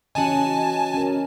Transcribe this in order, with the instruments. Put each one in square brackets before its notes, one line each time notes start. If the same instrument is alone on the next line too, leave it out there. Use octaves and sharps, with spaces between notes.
[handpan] C#3 E3 C#4 [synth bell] F#4 D#5 [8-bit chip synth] G#5 A5
[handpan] C#4 A#4